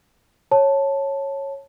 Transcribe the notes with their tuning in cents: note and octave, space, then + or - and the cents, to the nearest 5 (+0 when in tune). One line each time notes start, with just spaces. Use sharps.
C#5 -10 A5 +0